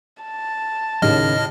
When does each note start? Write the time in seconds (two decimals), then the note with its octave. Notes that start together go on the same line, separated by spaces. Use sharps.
0.22 A5
1.02 D#2 A2 C#3 G#4 D#5 F6